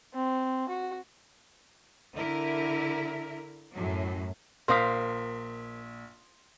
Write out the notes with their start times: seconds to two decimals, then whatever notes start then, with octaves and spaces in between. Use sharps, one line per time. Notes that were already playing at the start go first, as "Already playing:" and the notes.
0.14 C4
0.69 F#4
2.16 D3 E4 A#4
3.74 F#2 A2 F#3
4.68 A#1 A#4 C5 F5 C6 D#6 A#6 B6